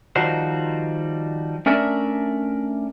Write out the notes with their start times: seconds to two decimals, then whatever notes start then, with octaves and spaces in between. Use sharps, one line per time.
0.16 D#3 F3 G3 D#4 F#4 C5
1.66 A3 C#4 D4 A#4 D5 E5